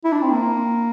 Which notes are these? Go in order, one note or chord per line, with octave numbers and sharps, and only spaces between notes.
E4
D4
C4
A#3